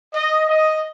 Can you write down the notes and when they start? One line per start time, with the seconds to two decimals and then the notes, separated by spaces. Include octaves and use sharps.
0.14 D#5
0.49 D#5